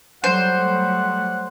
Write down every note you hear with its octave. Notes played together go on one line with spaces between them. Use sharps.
F#3 G3 A3 C5 F#5